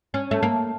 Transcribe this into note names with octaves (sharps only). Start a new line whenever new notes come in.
C#4
A3
A#3